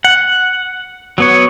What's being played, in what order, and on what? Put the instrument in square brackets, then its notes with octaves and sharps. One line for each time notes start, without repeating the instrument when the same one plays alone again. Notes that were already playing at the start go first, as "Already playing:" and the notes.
[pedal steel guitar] F#5
F#3 B3 C#5